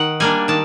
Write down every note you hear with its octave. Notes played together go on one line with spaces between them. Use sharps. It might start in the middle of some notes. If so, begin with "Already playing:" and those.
Already playing: D#3 F#5
G3 A#3 D4 G#5
D#3 A5